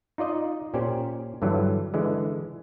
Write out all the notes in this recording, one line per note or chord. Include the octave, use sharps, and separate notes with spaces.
D#4 F4 D5 D#5
A#2 C#4 G4 C5 D5
G2 D3 E3 F#3
D3 E3 G#3